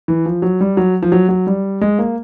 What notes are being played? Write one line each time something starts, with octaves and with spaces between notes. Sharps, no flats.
E3
F3
F#3
G3
F#3
F3
F#3
F#3
G3
G#3
A#3